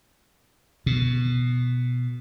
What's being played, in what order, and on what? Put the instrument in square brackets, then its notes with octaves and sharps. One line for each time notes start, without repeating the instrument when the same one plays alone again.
[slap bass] B2